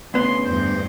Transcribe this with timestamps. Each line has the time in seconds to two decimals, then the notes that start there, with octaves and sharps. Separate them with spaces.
0.14 D2 C#3 B3 C6
0.45 E2 G2 C5